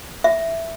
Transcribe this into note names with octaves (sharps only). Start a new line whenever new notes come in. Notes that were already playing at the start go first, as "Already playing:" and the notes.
E5